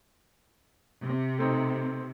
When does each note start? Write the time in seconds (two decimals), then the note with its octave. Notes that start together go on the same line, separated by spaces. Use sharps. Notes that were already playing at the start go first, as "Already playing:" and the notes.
1.03 C3
1.39 A3 C4 D#4